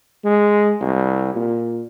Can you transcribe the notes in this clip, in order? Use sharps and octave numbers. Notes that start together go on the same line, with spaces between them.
G#3
C2
A#2